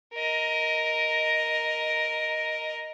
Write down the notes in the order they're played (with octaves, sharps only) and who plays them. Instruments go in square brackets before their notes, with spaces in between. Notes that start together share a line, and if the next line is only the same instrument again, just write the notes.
[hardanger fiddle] A#4 D#5